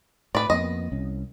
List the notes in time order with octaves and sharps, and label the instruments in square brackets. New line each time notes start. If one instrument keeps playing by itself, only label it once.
[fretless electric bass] A2 [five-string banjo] B4 D5
[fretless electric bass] F2 A#3 B3 [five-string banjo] D#5
[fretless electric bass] C2 C#4